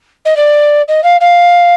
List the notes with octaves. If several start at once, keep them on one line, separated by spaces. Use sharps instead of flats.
D#5
D5
D#5
F5
F5